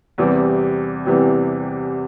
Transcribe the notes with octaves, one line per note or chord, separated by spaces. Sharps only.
E2 C3 E3 G3 C4
E2 C3 E3 G3 C4